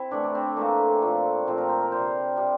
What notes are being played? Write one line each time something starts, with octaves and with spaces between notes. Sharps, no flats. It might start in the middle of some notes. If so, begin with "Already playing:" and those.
Already playing: C4 E4
A2 E3 A3 D4
D4
C4
A2 E3 A3 A#3
A#2 F3 A3
A#2 F3 A3 C4
A#4
C5
A#4
C3 G3 C5
C3 G3